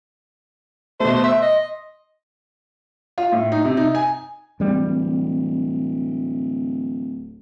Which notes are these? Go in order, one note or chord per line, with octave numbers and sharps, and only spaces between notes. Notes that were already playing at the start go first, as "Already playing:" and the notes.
B2 A3 C5
E5 C6
D#5
F4
A2
D#4
C3
D#4
G#5
D1 E3 G3 C4